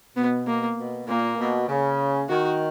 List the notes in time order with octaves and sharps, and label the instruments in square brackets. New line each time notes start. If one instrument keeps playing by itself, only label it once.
[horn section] B2 [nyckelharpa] B3
[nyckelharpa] A#3
[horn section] B2
[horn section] A#2 [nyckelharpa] A#3
[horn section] B2
C#3
[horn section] D#3 [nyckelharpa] F#4